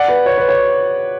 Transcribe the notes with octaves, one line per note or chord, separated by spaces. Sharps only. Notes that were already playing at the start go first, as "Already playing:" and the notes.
Already playing: D5 F#5
B4
C#5
B4
C#5